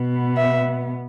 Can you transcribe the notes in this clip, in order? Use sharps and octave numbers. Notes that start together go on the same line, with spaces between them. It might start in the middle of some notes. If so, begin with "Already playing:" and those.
Already playing: B2 B3
E5